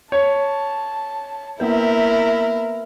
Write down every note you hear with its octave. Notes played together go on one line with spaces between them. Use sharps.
C#5 A5
A#3 B3 E4 A#4 B4 E5